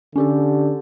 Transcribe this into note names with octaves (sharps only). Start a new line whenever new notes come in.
D3 C#4 G4 A4